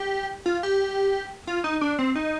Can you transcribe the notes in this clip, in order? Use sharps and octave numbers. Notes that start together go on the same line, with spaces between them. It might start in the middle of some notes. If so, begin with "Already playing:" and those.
Already playing: G4
F4
G4
F4
D#4
D4
C4
D#4